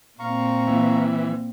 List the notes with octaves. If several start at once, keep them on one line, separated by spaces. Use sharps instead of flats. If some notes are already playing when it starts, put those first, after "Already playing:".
A#2 C4 F5 A#5 C#6
E3 A#3